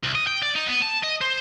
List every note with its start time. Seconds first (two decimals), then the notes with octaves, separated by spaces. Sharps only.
0.03 C2
0.15 D#5
0.27 G5
0.42 D5
0.55 D#4
0.67 B3
0.82 A5
1.03 D#5
1.21 C5